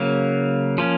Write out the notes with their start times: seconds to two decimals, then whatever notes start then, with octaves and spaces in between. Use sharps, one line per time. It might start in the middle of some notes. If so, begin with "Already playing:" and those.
Already playing: C#3 F#3 A#3
0.78 F3 A#3 C#4